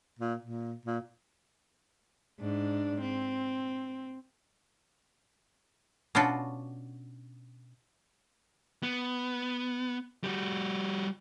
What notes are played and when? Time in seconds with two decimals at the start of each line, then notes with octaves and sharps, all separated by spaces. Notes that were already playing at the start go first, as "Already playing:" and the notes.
0.19 A#2
0.43 A#2
0.85 A#2
2.41 G#2 D4
3.01 C4
6.15 B2 C#4 D4 F4 F#4
8.83 B3
10.24 G3 F#4